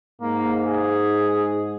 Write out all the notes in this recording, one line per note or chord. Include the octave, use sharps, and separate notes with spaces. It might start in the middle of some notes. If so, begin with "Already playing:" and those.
G#2 A#3
G#4